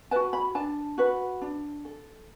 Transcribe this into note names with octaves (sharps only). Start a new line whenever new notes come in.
F#4 B4 A5
B5
D4 A5
F#4 B4
D4
A4